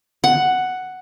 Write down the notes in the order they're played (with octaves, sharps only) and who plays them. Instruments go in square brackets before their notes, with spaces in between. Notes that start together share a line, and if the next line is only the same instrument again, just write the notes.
[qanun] F#5